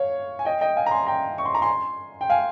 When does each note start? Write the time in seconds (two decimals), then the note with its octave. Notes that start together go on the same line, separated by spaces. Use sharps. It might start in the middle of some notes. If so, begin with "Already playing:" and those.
Already playing: C#5 F5
0.39 G#5
0.45 D#5 G5
0.61 D#5 G5
0.76 F5 G#5
0.86 A#5
0.91 G#5 C6
1.06 G5 A#5
1.38 C#6
1.45 C6
1.55 A#5
1.62 G#5 C6
2.21 G5
2.30 F5 G#5